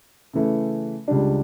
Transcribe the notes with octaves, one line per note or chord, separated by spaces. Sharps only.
C#3 E3 A3
C#2 C#3 G3 D4